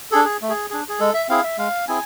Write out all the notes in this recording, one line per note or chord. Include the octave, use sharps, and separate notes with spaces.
D4 G#4 A4
G#4
A3
G#4
D4 G#4
G#4
G#3 A4
E5
C4 E4 G#4 F5
E5
G#3 F5
C4 E4 G#4 G#5